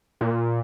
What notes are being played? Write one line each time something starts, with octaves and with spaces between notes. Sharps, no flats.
A#2